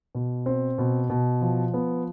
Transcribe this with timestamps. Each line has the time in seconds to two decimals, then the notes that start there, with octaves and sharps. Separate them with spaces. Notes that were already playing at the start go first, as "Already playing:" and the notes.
0.15 B2
0.46 C4
0.78 B2
1.10 B2
1.41 F3
1.74 B3